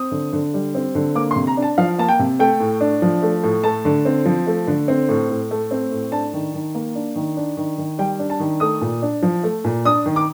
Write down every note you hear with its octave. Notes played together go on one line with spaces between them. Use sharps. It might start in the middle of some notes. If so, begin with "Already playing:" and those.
Already playing: C4 D#6
D3
D3
G3
C4
D3
A#3 D6
C6
C3
A#5
D4
A5
F3 F5
A#3 A5
G5
C3
A3 G5
A2
D4
F3
A3
A2
A3 A5
D3
C4
F3
A3
D3
C4
A2
A2
A3
C4
A2
D4 A5
D#3
D#3
A#3
D4
D#3
D4
D#3
D#3
G3 G5
D4
A5
D#3
A3 D#6
A#2
D4
F3
A3
A#2
D4 D#6
D#3
D6